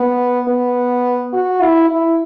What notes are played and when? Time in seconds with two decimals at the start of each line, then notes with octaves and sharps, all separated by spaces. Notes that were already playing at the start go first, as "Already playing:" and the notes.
Already playing: B3
0.48 B3
1.33 F#4
1.61 E4
1.89 E4